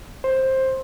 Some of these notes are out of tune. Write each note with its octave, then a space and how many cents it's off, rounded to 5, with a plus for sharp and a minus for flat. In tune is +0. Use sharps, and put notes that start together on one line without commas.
C5 +15